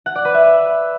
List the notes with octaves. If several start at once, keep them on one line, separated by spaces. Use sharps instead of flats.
F#5
D5
B4
E5